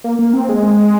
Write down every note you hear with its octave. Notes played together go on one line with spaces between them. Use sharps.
A#3
A#3
C4
G#3